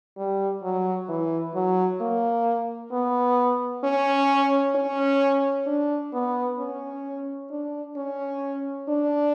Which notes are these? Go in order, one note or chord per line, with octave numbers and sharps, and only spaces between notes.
G3
F#3
E3
F#3
A#3
B3
C#4
C#4
D4
B3
C#4
D4
C#4
D4